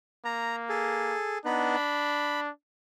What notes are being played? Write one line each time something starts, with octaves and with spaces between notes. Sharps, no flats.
A#3 A#5
G#4 A4
B3 D4 D#4 B4
B5